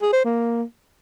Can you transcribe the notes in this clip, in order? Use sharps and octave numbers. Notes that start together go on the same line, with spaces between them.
G#4
C5
A#3